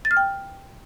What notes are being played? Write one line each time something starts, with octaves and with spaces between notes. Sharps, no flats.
A6
F6
G5